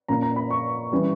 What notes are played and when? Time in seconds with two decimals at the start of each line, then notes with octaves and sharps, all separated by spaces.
0.08 A#2 A#3 C#4 A#5
0.22 A#5
0.36 B5
0.50 C#6
0.92 E3 G3 C#4